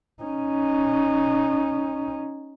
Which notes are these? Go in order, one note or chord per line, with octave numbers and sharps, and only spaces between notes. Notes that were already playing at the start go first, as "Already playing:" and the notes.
C#4 D#4